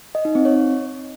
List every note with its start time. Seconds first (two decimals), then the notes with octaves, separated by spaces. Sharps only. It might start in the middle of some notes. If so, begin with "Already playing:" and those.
0.15 D#5
0.25 D#4
0.35 C4
0.45 C#5